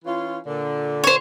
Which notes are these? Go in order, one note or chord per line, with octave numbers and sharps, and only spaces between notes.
E3 C#4 F4
A#2 D3
C5 C#5